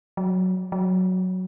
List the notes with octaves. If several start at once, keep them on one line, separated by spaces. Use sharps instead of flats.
F#3
F#3